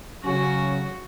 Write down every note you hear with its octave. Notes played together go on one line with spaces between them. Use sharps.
C#3 F#3 C#4 F#4